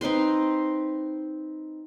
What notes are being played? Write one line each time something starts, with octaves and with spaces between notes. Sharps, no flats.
C4 D#4 B4 C6